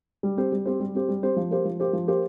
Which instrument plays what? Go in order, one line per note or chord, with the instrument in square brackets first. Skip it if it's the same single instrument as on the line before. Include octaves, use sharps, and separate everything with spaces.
[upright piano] G3
C4 G4 C5
G3
C4 G4 C5
G3
C4 G4 C5
G3
C4 G4 C5
F3
A#3 G4 C5
F3
A#3 G4 C5
F3
A#3 G4 C5